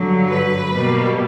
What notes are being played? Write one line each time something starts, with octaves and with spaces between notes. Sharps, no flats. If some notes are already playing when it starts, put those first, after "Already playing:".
Already playing: G2 D3 F#3
B4
B2 G3 A#3